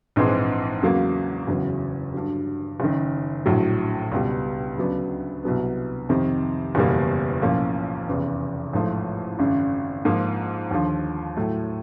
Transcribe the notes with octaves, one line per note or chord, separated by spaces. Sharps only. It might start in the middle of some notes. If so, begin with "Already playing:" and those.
A#1 G#2 E3 G#3 C4
E2 C#3 F#3 A#3
F#1 E2 C#3 F#3
G2 D3 F#3
F#1 F#2 D#3
A#1 A2 F#3
C#2 B2 G3
D2 C#3 F#3 B3 D4
C2 B2 F#3 B3
F2 C3 D#3
F#1 E2 B2 G3 A#3
B1 A2 F3 A#3 C#4
F1 E2 C#3 E3
A1 G#2 F3 A3
G#1 F#2 C#3
G#2 F3 A#3
D#2 D3 F3
A2 F#3 A3